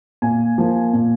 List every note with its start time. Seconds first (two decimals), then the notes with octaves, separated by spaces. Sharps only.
0.22 A#2 G#5
0.58 F3 A#3
0.93 A#2